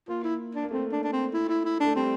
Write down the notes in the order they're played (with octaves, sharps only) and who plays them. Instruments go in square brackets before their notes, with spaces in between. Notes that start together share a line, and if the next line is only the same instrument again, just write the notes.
[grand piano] A#3 [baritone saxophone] F4
[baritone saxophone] E4
D4
[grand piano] A#3
[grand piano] A3 [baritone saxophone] C4
[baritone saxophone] D4
D4
C4
E4
E4
E4
[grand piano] A3 [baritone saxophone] D4
[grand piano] G3 [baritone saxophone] C4